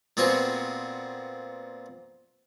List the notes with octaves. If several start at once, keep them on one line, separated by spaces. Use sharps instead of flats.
A#2 B3 C4 F#4 G#4